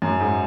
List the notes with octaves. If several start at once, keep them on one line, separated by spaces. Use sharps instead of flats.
F#2
G#2